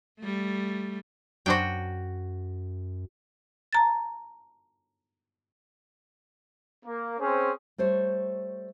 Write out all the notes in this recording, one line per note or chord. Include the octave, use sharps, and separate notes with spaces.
G3 A3
F#2 F#3 D4 F#4 C5 G5
A5 A#5 A6
A#3
C4 C#4 G#4 C5
G3 A3 C5 C#5